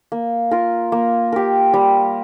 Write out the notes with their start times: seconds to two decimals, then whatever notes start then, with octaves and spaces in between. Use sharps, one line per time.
0.12 A#3
0.51 F4 A#4
0.92 A#3
1.32 G4 A#4
1.74 G3